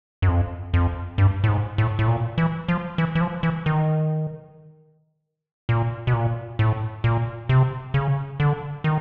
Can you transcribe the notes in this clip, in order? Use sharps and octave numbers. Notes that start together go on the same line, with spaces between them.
F#2
F2
F2
G2
A2
G#2
A2
A2
A#2
E3
F3
E3
E3
F3
E3
D#3
A#2
B2
A#2
A2
A#2
C3
C#3
D3
D#3